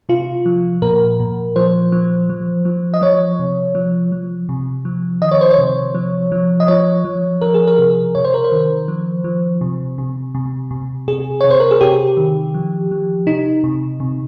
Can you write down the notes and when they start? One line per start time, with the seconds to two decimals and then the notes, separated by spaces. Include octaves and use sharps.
0.09 C3 F4
0.46 F3
0.82 A#2 A#4
1.20 A#2
1.56 F3 C5
1.92 F3
2.30 F3
2.65 F3
2.94 D#5
3.02 F3 C#5
3.39 C3
3.75 F3
4.12 F3
4.49 C3
4.85 F3
5.22 D#3 D#5
5.31 C#5
5.41 C5
5.51 C#5
5.58 C3
5.94 F3
6.32 F3
6.60 D#5
6.68 F3 C#5
7.05 F3
7.41 F3 A#4
7.54 G#4
7.67 A#4
7.79 C3
8.15 C3 C#5
8.24 C5
8.34 A#4
8.44 C5
8.52 D#3
8.88 F3
9.24 F3
9.61 C3
9.98 C3
10.35 C3
10.71 C3
11.08 C3 G#4
11.41 C3 C#5
11.50 C5
11.60 A#4
11.71 G#4
11.81 C3 G4
12.17 D#3
12.54 F3
12.91 F3
13.27 C3 D#4
13.64 C3
14.00 C3